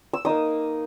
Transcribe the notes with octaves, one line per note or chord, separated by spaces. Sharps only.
E6
A#3 D#4 D#6